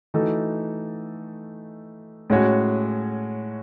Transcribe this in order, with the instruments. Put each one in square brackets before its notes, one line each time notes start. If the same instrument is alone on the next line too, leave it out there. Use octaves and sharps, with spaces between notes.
[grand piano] E3 A3 D#4 F#4 A4
A2 G#3 C#4 F#4 C#5